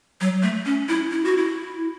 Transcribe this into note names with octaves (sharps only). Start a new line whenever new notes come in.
F#3
A3
C#4
E4
E4
F#4
E4